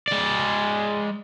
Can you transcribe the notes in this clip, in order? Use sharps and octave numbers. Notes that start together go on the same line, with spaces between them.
G#3 D5